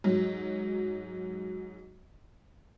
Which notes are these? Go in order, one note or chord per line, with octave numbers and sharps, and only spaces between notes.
G#2 F#3